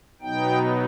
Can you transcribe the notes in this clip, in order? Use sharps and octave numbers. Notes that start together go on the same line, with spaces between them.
B2 F#3 B3 D#4 G5